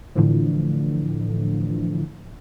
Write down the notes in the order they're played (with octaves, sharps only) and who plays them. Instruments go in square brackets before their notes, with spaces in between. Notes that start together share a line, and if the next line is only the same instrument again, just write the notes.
[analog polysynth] A2 D3 E3 F3